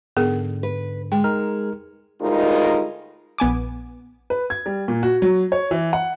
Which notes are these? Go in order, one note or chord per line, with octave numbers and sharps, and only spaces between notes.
G#2 D3 B3 G#4 A#4
B4
G#3 G5
D#4 A#4 F6
D2 G3 G#3 D#4 F4 A#4
A#1 B3 G#5 D6
B4
G#6
G3
A#2
F#4
F#3
C#5
E3
F#5